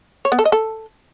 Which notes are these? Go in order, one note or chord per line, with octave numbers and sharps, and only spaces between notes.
C#5
B3
A4
D#5
A4